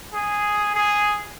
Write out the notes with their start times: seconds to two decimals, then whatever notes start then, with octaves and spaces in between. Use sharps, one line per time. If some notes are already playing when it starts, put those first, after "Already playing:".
0.14 G#4
0.75 G#4